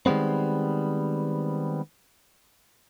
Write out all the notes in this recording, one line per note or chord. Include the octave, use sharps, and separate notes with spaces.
D#3 G3 G#3 B3 C4